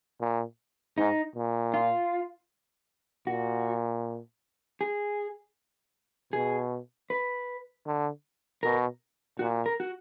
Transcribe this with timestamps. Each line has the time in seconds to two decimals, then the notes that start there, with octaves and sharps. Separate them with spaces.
0.21 A#2
0.97 G#2 D#4
1.35 A#2
1.74 F4
3.27 A#2 F#4
4.81 G#4
6.33 B2 G#4
7.10 B4
7.86 D3
8.63 B2 A#4
9.39 A#2 F#4
9.66 A#4
9.80 F#4